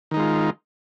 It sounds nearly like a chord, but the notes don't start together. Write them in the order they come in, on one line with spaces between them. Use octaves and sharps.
D#3 D#4 G#3 F4